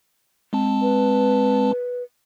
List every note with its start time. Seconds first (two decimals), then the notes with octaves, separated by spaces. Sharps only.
0.53 G#3 C4 A5
0.82 B4